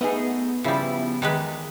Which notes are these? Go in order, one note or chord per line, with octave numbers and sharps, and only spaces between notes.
A3 B3 D#4 G#4
C#3 F3 G3 E4
E2 D#3 G#3 B4